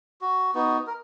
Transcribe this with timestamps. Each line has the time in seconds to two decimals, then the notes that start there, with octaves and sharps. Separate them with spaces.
0.21 F#4
0.54 B3 D#4 F#4
0.87 A#4